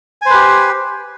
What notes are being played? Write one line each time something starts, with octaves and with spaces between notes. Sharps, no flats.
G4 B4 C5 G#5